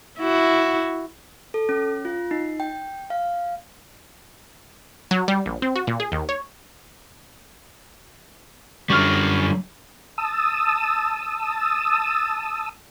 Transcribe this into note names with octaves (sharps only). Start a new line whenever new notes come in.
E4 F#4
A4
C#4
F4
D#4
G5
F5
F#3
G3
A#1
C4
F#4
A#2
G#4
D#2
C#5
F#2 D3 G3 C#6 F6
A5 D#6 E6